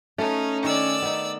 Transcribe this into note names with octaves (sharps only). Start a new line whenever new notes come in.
A3 C#4 D#4
D#3 D5 E6
B3 D#4